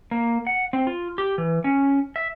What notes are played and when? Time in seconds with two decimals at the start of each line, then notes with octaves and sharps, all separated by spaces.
0.11 A#3
0.47 F#5
0.73 C4
0.87 F4
1.18 G4
1.38 E3
1.64 C#4
2.16 E5